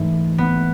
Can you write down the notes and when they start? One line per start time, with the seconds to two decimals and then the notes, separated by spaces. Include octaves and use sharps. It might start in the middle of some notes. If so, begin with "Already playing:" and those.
Already playing: G#2 E3 A3
0.38 B3